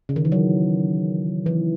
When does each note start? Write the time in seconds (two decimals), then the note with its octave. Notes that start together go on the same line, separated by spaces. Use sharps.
0.09 C#3
0.16 D#3
0.25 E3
0.32 F#3
1.46 E3